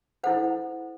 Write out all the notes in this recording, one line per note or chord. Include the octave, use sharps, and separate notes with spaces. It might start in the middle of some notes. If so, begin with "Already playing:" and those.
E4 A4 C5 F#5